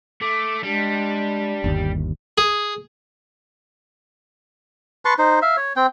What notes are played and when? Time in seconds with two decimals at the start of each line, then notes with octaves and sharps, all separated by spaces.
0.22 A3 D6
0.64 G3 G#3 D4
1.64 G1 D#2
2.38 G#4
5.05 B4 A5 C6 C#6
5.19 D#4 C5
5.42 E5 F5
5.57 C#5
5.76 C4 G5